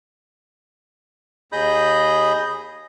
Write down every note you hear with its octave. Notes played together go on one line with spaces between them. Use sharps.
D#2 G#4 D#5 B5 D#6 G6